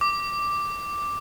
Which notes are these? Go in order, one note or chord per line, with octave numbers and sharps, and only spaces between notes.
D6